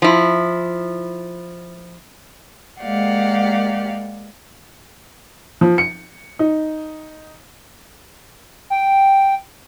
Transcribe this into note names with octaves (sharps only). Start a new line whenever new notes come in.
F3 E4
G#3 A#3 G4 D5 F5 F#5
F3
C#7
D#4
G5